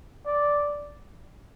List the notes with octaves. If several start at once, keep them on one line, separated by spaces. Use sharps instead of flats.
D5